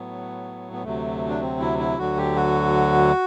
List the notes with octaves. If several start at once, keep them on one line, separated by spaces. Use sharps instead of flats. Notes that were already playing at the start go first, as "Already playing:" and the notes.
Already playing: A2 F#3 B3
B3
D2 C3 F#3 A3
D4
C4
E4
E4
D2 D3 F#3 F#4
G4
F#4